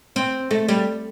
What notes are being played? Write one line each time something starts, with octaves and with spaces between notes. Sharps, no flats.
C4
A3
G3